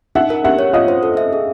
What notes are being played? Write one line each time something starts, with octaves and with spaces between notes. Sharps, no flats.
D#4 E5 F#5
A#4
G4 E5 F#5
C#5
F4 D#5 F5
C5
A4
E5
G#4